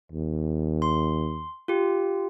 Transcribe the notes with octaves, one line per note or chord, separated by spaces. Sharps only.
D#2
C6
F4 G4